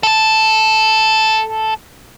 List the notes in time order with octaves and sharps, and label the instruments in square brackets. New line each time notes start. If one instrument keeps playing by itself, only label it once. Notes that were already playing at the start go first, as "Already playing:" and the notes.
[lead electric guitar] A4 A5